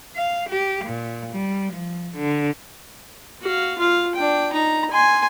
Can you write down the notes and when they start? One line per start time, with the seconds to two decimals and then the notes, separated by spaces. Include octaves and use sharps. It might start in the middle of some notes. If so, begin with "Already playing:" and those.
0.17 F5
0.49 G4
0.84 A#2
1.33 G3
1.73 F3
2.16 D3
3.42 F#4 F5
3.78 F4 F5
4.15 D4 G5
4.53 D#4 A#5
4.91 G#5 C6